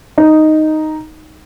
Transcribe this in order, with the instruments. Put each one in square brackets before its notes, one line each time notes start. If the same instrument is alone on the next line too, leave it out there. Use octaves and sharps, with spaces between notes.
[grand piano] D#4